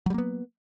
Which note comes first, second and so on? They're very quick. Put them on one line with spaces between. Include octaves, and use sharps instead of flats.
F#3 G3 A#3 B3